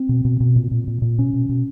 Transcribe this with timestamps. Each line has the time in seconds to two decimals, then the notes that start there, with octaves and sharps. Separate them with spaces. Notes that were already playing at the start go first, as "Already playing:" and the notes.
Already playing: C4
0.09 B2
0.25 B2
0.40 B2
0.56 A#2
0.71 A#2
0.87 A#2
1.02 A#2
1.18 B2 C#4
1.34 B2
1.49 B2